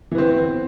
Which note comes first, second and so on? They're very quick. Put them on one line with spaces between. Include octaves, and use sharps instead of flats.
E3 B3 C4